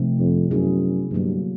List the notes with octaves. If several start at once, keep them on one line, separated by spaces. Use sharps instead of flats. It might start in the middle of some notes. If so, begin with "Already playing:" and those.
Already playing: C3 F3 A3 C4 D#4
F2
F#2 F#3 B3 E4 G#4
G2 D3 F#3 A#3